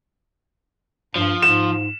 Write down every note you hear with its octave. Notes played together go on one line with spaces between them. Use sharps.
G2 F3
G#2 E7